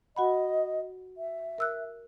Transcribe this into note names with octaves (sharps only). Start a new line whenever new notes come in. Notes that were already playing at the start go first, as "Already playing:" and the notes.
F#4 D#5 F#5 B5
E5
A#4 E6 F#6